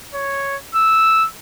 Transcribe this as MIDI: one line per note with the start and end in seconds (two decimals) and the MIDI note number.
0.14 0.56 73
0.75 1.26 88